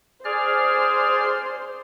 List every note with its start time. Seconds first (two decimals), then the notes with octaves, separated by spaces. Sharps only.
0.25 G#4 C5 D5 F6